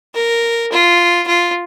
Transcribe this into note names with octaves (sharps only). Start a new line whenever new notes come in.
A#4
F4
F4